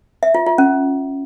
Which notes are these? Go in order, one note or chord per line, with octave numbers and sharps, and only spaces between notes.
E5
F4
F4
C#4